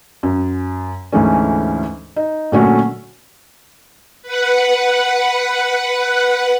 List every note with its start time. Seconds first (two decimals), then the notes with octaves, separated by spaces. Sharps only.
0.23 F#2
1.12 D2 G#2 E3 A3 C#4
2.16 D#4
2.52 A#2 D3 F#3 A3 C#4 F#4
4.22 B4 F#5